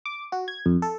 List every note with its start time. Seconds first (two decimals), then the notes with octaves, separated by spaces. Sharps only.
0.06 D6
0.32 F#4
0.48 G#6
0.66 F2
0.82 A4